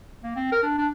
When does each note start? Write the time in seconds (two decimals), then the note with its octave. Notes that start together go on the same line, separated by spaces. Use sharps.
0.23 A#3
0.36 C4
0.52 A#4
0.63 D4
0.78 D4